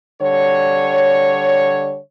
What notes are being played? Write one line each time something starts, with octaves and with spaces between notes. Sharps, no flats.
D3 G3 C#5